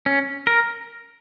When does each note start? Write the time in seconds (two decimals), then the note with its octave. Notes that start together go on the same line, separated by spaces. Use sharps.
0.06 C#4
0.47 A#4